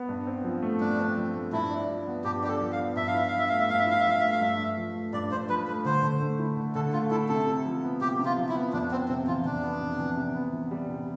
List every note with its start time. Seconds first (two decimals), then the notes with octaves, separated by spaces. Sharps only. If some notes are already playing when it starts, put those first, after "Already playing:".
Already playing: B3
0.09 G2
0.27 C4
0.44 F3
0.62 A3
0.80 G2 D4
0.99 C4
1.17 F3
1.35 A3
1.53 G2 E4
1.71 D4
1.89 F3
2.07 B3
2.24 G2 G4
2.43 D4 G4
2.48 A4
2.61 F3
2.72 F5
2.79 B3
2.96 G2 E5
3.07 F5
3.14 E4 E5
3.28 F3 F5
3.39 E5
3.49 A3 F5
3.59 E5
3.69 G2 F5
3.79 E5
3.87 E4 F5
4.00 F3 E5
4.10 F5
4.20 A3 E5
4.32 F5
4.41 G2 E5
4.59 G2
4.77 F3
4.95 A3
5.13 G2 D5
5.31 G2 C5
5.49 F3 B4
5.67 A3 B4
5.85 D3 C5
6.03 D3
6.21 A3
6.39 E4
6.57 D3
6.75 D3 A4
6.93 A3 F4
7.11 E4 A4
7.29 C3 A4
7.47 C3
7.65 F3
7.83 B3
8.01 C3 G4
8.19 C3
8.25 F4
8.37 F3
8.49 E4
8.55 B3
8.73 F2 D4
8.91 B3 C4
9.08 C3 C4
9.27 E3 F4
9.45 F2 D4
9.63 B3
9.81 C3
9.99 E3
10.17 C3
10.35 B3
10.53 E3
10.71 G3
10.89 C3